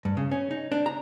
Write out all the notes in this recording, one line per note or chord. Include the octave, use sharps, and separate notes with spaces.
G2
C#3
C#4
D#4
D4
A#5